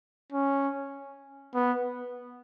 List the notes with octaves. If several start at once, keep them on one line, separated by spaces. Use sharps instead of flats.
C#4
B3